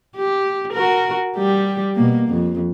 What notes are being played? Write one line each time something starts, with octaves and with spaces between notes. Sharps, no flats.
G4
F#4 A#4
G3 G4
B2 A#3
F2